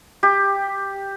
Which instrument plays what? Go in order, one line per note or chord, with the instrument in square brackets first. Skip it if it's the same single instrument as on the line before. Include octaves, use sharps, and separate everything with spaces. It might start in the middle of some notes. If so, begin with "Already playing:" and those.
[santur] G4